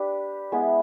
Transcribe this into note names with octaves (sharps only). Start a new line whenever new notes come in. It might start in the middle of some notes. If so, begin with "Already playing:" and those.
Already playing: D4 G4 B4
G#3 B3 E4